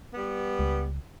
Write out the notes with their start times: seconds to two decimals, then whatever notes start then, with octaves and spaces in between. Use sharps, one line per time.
0.14 G3 B3
0.59 C#2